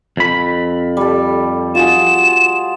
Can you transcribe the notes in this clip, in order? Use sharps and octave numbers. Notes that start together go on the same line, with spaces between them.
F2 B5
G3 A4
F4 F#4 G#4 E7